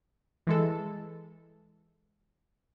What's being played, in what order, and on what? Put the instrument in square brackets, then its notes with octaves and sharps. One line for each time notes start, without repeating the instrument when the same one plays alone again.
[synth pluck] E3 G#3 A4